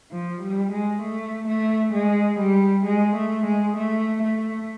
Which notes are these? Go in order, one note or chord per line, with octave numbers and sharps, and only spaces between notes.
F3
G3
G#3
A3
A3
G#3
G3
G#3
A3
G#3
A3
A3